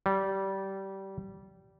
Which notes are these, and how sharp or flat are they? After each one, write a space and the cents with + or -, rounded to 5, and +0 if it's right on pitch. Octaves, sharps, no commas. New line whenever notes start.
G3 -20